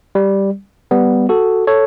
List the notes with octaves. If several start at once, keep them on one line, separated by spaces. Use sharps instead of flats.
G3
G3 B3
F#4 A4
A4 C#5